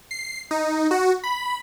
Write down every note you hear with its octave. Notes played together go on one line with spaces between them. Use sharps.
C7
D#4
F#4
B5